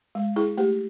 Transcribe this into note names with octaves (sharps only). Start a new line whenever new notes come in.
G#3
E4 G#4
A3 G4